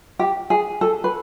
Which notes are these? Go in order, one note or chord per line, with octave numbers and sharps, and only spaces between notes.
G4
G#4
A4
B4